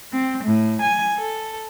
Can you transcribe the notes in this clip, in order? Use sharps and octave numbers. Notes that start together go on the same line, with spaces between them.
C4
A2
G#5
A4